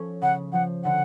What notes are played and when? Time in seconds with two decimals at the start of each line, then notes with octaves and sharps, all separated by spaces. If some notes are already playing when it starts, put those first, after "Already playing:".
Already playing: F3 C#4 A4
0.22 C#3 F#5
0.53 F3 F#5
0.84 D3 F#5